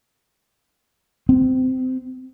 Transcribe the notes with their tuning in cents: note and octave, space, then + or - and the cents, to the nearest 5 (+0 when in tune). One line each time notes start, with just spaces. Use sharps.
C4 -25